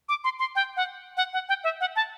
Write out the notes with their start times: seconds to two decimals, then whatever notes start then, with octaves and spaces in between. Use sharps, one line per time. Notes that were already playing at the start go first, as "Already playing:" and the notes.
0.09 D6
0.24 C6
0.39 C6
0.55 G5
0.77 F#5
1.17 F#5
1.33 F#5
1.49 G5
1.64 E5
1.81 F#5
1.96 A5